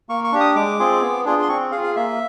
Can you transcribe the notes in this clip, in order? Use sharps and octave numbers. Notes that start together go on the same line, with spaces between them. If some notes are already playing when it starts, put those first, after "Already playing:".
A#3 C#6
C#6
D4 G4
D#6
G#3 D6
C4 F4 G#4
B3
D4 F4 G#4
C6
C4 C#6
G#4 F5
F4
F5
A#3 E5